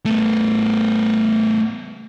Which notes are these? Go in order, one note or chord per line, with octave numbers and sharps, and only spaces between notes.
A3 B3